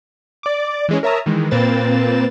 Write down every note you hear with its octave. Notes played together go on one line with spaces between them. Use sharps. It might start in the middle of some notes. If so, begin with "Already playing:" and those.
D5 D6
E3 G#3 C#4
A#4 C#5 E5 A5 A#5 D#6
D#3 E3 G#3
A#2 A#3 C4 B4 A6 E7